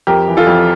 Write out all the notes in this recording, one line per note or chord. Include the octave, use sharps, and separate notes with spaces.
F2 G4 A#4
E3
F4 A4
F2